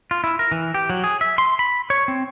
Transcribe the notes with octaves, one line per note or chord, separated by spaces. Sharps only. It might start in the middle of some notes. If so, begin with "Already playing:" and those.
F4
E4
A#4
E3
G4
F#3
G#4
E5
C6
B5
C#5
C4